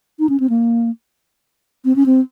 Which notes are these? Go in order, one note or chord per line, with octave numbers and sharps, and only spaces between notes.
D#4
C#4
C4
A#3
C4
C#4
C4